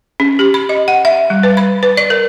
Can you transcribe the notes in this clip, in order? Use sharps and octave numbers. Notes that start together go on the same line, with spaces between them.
C#4
G4
B5
D#5
F#5
E5
G3
B4
B5
B4
D5
A#4